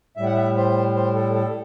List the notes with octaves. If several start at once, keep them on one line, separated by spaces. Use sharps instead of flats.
A2 G3 E5
F#5
E5
C5
C5
A4
A4